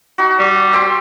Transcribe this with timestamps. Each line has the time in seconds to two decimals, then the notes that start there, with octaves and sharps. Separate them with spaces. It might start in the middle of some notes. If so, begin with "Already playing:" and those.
0.18 D#4 F#4
0.39 G3
0.73 E5 G5 C6